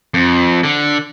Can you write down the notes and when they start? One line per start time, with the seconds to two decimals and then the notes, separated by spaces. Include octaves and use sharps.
0.14 F2
0.63 D3